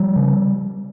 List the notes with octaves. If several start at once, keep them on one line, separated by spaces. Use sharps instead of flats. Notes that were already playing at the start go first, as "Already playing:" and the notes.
Already playing: F3 G3
C#3